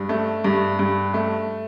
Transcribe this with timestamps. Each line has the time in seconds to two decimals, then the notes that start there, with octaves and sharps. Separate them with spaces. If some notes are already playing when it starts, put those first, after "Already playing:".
Already playing: G2
0.09 A3
0.44 G2
0.79 G2
1.14 A3